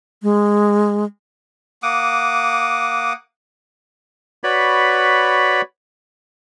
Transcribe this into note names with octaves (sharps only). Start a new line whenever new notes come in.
G#3
A#3 F#5 D6 D#6
F#4 B4 C#5 D5 B5